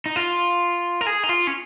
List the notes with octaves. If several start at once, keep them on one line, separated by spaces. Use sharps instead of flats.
D#4
F4
A#4
G#4
D#4
F4
C#4